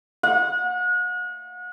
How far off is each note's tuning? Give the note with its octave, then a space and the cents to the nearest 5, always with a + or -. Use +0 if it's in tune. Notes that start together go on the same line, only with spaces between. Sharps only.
F#5 -35